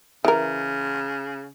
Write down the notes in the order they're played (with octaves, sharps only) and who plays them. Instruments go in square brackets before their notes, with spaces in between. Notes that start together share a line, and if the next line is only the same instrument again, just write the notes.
[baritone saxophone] C#3 [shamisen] E3 A#4